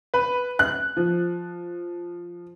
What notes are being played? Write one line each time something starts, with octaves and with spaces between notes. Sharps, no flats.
B4
F#6
F3